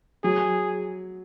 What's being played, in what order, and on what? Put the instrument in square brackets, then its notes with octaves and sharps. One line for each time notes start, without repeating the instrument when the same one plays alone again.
[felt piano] F#3 [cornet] G#4